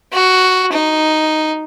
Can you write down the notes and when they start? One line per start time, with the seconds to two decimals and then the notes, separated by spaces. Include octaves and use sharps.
0.13 F#4
0.73 D#4